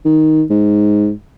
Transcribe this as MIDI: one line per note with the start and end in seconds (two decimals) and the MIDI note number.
0.05 0.44 51
0.50 1.12 44